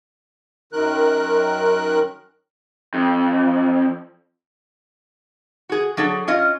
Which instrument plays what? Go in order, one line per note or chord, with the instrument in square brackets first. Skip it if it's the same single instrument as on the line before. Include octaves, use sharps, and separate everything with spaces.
[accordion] F#2 D#3 A#4 F#6
[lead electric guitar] F2
[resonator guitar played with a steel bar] F#4 G#4
F#3 D4 G#4 A4
C#4 F4 D#5